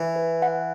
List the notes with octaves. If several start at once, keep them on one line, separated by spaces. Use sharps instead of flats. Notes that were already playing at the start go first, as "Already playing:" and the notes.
Already playing: E3
B4
F#5